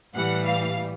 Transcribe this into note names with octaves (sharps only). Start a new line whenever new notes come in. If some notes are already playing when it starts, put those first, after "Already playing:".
A2 E3 G3 F#5
F5